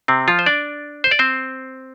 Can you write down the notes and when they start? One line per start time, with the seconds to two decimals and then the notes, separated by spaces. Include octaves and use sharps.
0.08 C3 C4
0.28 F3 F4
0.39 C5
0.46 D4 D5
1.04 C5
1.11 D5
1.19 C4 C5